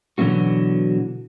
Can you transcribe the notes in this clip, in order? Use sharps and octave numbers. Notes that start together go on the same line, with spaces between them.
B2 D3 E3 F#3 A#3 F#4